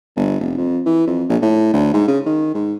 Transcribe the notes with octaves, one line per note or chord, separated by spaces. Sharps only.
G1
F1
F2
E3
F2
A#1
A2
D2
G#2
C#3
D#3
G#2